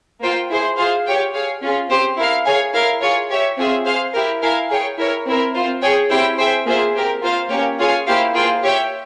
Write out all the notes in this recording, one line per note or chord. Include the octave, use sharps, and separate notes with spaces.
A#3 F4 C5 G5
E4 G#4 C5
F4 G#4 C5 F5
G4 C#5 G5
G#4 C#5 F5
C#4 F4 G#4
C4 G4 C5
E4 A#4 F5
G#4 C#5 F5 G#5
E4 A#4 F5
F4 G#4 C#5
G4 C#5 E5
C4 F4 G#4 E5
G#4 C5 F5
E4 G4 A#4
E4 A#4 F5 G#5
G#4 C#5 G5
E4 A#4 C#5
C4 E4 A#4
C4 F4 C5
G#4 C#5 G5
C4 E4 G4 C5 G5
G#4 C5 E5 G5
A#3 F4 G#4 C5 E5
C4 G4 A#4
A#3 F4 C5 F5
A#3 C#4 G4 C#5
F4 G#4 C#5 F5 G#5
A#3 E4 G4 C5 F5
A#3 F4 G#4 C5 G5
G4 C#5 E5 G5